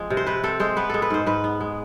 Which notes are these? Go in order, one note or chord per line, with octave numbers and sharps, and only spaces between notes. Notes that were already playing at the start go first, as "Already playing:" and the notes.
Already playing: F3 G#3 C4
C3
C5
C3 B4
C4 A4
G#3 C5
B3 B4
G#3 A4
B4
G#2 C5
G#2 B4
B3
G#3